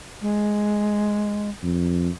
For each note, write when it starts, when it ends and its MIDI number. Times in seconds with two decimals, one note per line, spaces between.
0.22 1.50 56
1.63 2.09 41